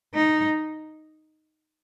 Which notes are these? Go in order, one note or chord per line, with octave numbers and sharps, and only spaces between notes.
D#4